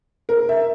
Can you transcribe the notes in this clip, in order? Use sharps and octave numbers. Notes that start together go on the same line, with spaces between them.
A#4
E5